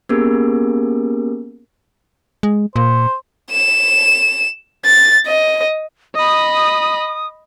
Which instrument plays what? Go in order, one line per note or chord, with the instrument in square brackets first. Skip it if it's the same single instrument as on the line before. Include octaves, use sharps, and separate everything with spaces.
[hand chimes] A#3 B3 C#4 G4 G#4 A#4
[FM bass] G#3
[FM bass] A#2 [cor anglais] C5
[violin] E7
A6
D#5
[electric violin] D#5 B5 [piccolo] D#6